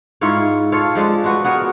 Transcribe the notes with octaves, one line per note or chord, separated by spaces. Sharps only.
G#2 E4 F4 C#5
F4 A4 C#5
F3 G#3 D4
G#3 F#4 B4
B3 F#4 G#4 A#4